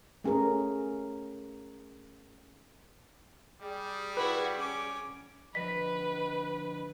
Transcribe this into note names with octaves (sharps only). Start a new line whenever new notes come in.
A3 C#4 G#4 A#4
G3 G#4
E4 F#4 B4
C#4 D6
D3 F3 B4 D#5 B6